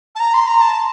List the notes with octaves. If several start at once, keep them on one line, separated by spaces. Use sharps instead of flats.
A5
A#5
C6
A#5
A5